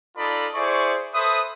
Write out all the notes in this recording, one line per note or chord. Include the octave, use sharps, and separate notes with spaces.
D#4 F4 A4 D5 D#5 B5
E4 G#4 C5 D5 C#6
A4 B4 C5 E5 D#6